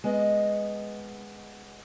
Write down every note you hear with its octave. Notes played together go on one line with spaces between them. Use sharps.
G#3 B3 D#5